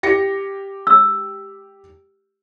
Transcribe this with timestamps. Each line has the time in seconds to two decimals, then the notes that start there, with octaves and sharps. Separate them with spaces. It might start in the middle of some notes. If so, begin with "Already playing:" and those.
0.03 G4 A#6 C#7
0.87 E6